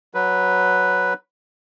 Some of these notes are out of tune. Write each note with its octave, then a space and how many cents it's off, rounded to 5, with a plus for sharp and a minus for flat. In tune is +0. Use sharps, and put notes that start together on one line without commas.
F#3 +0 B4 +0